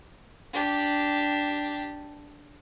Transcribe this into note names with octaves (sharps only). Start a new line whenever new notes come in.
D4 G4